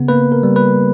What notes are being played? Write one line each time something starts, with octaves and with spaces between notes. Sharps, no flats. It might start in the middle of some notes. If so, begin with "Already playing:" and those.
Already playing: C#3 B3
A#3 B4
A#4
G3
B4